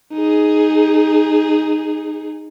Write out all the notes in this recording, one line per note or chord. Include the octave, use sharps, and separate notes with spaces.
D#4 G#4